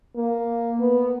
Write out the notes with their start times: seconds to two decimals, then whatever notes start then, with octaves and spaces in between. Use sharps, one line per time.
0.16 A#3
0.80 B3